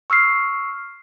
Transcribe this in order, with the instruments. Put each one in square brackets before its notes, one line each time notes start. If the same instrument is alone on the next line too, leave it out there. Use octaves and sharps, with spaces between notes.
[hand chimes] C#6 E6 F6 C7